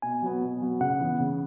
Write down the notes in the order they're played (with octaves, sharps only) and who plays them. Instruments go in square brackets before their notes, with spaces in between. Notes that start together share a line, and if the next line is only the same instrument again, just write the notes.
[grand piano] B2 [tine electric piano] G#5
[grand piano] F#3 B3
B2
F#3 B3
[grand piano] C#3 [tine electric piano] F#5
[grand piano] E3 B3
C#3